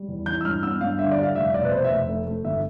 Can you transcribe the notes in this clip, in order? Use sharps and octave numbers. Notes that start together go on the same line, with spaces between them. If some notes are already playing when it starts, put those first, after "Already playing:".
Already playing: G3
E2
E3 G6
E6
G2 F6
B3 E6
G2 F5
D3 E5
D5
G3
F5
F1 E5
B2 D5
B4
C3 C5
E5
F1
A3
A3
G1 E5